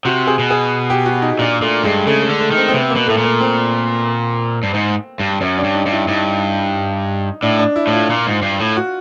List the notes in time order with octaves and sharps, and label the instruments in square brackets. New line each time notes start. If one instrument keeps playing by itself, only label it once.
[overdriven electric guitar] C3 [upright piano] F#4
[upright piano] G#4
[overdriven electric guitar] B2
[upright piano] G#4
G4
F#4
D#4
[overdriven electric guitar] A#2 [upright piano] D4
[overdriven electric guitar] A#2 [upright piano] A3
[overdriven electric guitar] G2 [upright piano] G#3
[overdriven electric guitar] C#3 [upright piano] A3
[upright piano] A3
[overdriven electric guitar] D3
[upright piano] A3
[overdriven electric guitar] D#3
[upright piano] C4
C4
[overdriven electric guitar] C3 [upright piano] B3
[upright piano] A#3
[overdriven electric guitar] B2
[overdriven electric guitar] A2 [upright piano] A3
[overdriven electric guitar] A#2
[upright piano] A#3
C4
[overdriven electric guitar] G2
G#2
G2
[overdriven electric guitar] F#2 [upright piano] C#4
[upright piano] D4
[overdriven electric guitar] G2
[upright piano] D#4
[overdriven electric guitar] G2
[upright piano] E4
[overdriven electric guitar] G2 [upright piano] D#4
[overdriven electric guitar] A2 [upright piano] D4
[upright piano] D4
E4
[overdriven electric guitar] A2
[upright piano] F4
[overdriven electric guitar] A#2
G#2
G2
A2
[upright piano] F#4